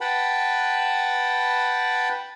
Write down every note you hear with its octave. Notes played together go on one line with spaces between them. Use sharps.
B4 F#5 G5 A5 B5